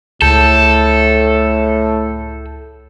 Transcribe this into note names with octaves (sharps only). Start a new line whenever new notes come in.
C#2 A2 A4 G6